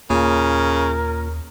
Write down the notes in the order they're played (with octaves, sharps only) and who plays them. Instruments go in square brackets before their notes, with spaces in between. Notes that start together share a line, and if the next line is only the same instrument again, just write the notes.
[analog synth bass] D#2 [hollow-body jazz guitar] A#2 [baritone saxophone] C#3 [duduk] A#4